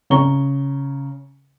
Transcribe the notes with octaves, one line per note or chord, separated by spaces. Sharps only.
C#3 C#5 A#5 C#6 G7